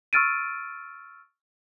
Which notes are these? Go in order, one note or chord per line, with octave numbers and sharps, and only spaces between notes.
C#6 E6 F6 A6 D7 D#7